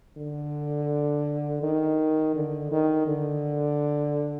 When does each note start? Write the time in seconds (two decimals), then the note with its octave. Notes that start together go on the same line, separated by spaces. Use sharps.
0.17 D3
1.62 D#3
2.35 D3
2.72 D#3
3.07 D3